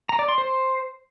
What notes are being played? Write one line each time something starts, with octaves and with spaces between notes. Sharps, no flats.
A#5
D5
C6
C5